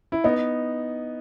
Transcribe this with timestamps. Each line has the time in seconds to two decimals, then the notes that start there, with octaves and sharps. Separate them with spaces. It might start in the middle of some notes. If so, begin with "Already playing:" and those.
0.12 E4
0.24 B3 D#4